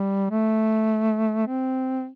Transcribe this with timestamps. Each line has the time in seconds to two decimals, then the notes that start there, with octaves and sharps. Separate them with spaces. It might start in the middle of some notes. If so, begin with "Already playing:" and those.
Already playing: G3
0.30 A3
1.47 C4